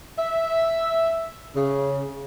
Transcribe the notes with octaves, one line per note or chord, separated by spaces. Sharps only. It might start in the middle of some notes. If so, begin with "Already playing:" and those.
E5
C#3